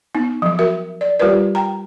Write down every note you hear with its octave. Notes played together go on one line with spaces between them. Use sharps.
B3 D#4
F3 F#3
F#4 A#4 E5
D5
G3 F4 G4 A#4 B4 D5
G5 A#5